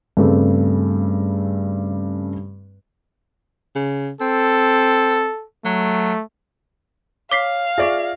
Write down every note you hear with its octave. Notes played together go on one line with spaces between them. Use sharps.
G2 C#3 A3 C4
C#3
C4 A4
F#3 A3
C#5 F5 D6 B6 C7
F4 G#4 D5 E5 C#6 A#6